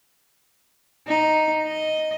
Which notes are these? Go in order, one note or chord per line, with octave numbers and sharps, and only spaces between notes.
D#4
D#5